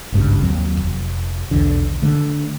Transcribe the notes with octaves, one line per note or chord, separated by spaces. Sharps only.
G#1 C#2 G2 C#3
D#2 F#3 C4
F1
B1 E2 D3
D3 A3